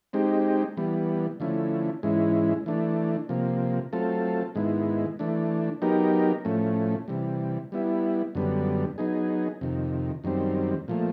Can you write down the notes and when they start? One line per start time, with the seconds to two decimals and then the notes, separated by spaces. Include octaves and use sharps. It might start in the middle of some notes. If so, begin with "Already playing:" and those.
0.13 G#3 C4 D#4 G4
0.77 E3 G3 B3
1.40 D3 F3 A3 C#4 E4
2.03 G#2 E3 G#3 C#4 E4
2.66 E3 A3 D4
3.29 C3 F3 A#3
3.93 F#3 A3 C4 F4 A4
4.55 G#2 D#3 G#3 B3 E4
5.19 E3 A3 D4
5.82 F#3 B3 D#4 G4 A#4
6.45 A2 F3 A3 C#4
7.08 C3 E3 G3
7.72 G3 B3 E4
8.35 F#2 D3 G3 B3
8.98 F#3 B3 D#4 G#4
9.61 F2 C3 D#3
10.24 F#2 D#3 G3 C4
10.88 A#2 F3 A3